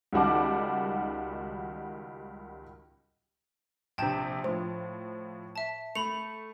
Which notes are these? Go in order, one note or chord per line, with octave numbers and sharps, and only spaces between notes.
C#2 D#3 G3 F#4 A5 D6
A#1 C3 G5 A5 G6
A2 F3 C5
E5 A5
A3 B5 C#7 F7